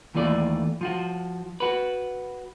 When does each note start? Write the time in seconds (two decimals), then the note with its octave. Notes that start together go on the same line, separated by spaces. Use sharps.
0.15 D#2 E3 A3 F4 D5
0.81 F3 F4 F#4
1.60 F#4 B4